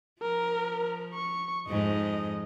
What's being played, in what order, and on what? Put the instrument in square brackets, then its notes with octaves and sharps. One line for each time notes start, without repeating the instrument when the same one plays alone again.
[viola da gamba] F3 [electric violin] A#4
[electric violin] C#6
[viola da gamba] F2 G#2 [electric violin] D#5